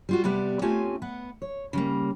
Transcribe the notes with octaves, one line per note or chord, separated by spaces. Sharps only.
G3 F4 F#4
C3 G3 B3 D5 F#5
A3 C4 C#4 F4 G4 G#5
B3 F#5
C#5
C#3 G3 A#3